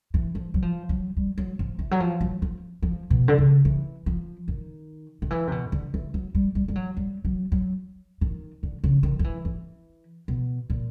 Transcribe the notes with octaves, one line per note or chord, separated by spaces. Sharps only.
E3
F3
F#3
F3
F#3
G3
F#3
F3
E3
F#3
F3
F#3
F3
F3
B2
D3
C#3
E3
F3
D#3
D#3
E3
C3
B2
D3
E3
F#3
G3
G3
G3
F#3
G3
F#3
F#3
D#3
D3
C#3
D#3
F3
E3
E3
B2
A#2